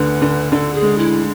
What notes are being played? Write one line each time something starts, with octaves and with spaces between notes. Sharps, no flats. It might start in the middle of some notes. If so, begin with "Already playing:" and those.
Already playing: D2 D3 B4
D3
D3 A4
G#4
G#3
E4